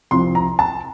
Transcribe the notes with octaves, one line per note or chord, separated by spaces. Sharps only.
C2 C3 F3 C4 C6
A#5
A5